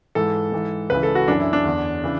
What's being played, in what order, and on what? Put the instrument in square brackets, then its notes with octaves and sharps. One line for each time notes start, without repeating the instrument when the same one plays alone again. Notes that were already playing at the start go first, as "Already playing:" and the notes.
[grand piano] G#2 E3 A4
G#2 E3
C#2 C#3 E3 B4
A4
F#4
F#2 E3 D4
E4
D4
E2 D3
C#3 E3